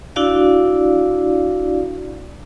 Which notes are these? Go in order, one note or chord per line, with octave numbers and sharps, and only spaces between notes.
D4 E4 F#4 D5 F5